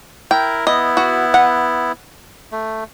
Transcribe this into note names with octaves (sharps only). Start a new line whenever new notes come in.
E4 A#4 G5
B3 E4 D#5
F#4
F#5
A3